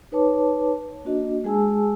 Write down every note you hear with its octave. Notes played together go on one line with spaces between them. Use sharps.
D#4 B4 C#5 A5 D6
A#3 D4 F#4 D#5
G#3 G#4 G#5 A5 E6